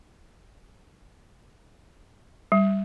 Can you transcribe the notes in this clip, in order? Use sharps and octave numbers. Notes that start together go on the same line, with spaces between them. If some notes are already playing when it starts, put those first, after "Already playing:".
G3